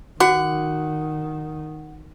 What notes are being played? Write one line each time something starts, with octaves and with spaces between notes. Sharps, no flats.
D#3 F#4 F#5 D6